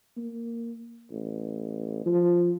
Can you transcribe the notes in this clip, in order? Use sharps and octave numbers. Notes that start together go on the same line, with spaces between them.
A#3
A1
F3